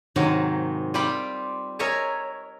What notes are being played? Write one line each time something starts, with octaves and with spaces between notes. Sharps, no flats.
G#2 C3 D#3 F#3 G#3
G3 C4 F4 G4 G5 B5
A#4 C#5 D#5 E5 G#5 A5